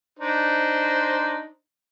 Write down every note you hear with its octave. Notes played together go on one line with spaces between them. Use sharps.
D4 D#4 C5